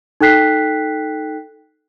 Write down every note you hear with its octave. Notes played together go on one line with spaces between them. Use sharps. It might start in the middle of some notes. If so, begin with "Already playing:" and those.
D#4 A4 G5 F#6 B6 C7